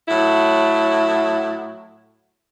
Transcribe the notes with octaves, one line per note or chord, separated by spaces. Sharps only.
A2 F#3 E4